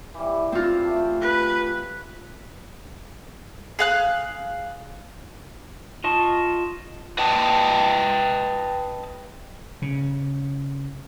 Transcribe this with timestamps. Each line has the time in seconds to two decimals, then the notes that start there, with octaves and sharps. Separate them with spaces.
0.14 E3 G3
0.52 C4 F4
0.84 A3 G4
1.21 B4
3.79 G#4 F5 F#6
6.04 F4 D#5 A5 C#6
7.18 B4 D#5 G5 A5
9.82 C#3